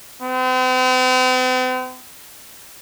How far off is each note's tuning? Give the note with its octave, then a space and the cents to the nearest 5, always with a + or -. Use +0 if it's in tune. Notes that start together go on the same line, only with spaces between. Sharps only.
C4 -45